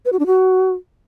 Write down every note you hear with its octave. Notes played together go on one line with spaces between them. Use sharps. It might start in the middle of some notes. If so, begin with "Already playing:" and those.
B4
F#4
D4
F#4